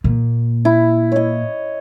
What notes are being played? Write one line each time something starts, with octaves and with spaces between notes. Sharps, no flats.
A#2
E4
C#5 D#5